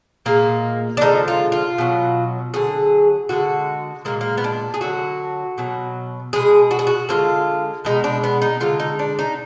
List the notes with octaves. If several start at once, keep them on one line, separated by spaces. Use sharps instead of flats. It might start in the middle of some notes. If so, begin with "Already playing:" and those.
A#2 G#3 A#3
D4
D3 F3 G#3 D#4
F4
F4
B2 F#3
D3 F#3 G#4
D3 G#3 F#4
A#2 G#3 A#3
A#3
B3
D4
G#4
D3 F#3 F#4
B2 F#3
B2 G#3 G#4
F#4
G#4
F#4
D3 F3 G#3 F4
B2 G#3 D#4
D4
B3
D#4
D3 G#3 F4
D#4
D4
D#4